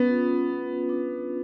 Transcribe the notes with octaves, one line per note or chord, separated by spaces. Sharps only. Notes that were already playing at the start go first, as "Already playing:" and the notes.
Already playing: B3 C#4
F4
B3
D4